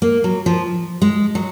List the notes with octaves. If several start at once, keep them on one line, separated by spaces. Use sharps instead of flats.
A#3
F#3
F3
G#3
F#3